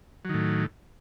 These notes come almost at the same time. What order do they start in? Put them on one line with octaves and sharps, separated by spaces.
F#3 D#3 A2